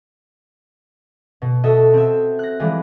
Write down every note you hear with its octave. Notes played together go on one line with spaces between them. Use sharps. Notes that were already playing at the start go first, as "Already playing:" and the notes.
B2
F#4 A4 D#5 E5
C4 E5
F#6 A#6
E3 F3 G3 G#3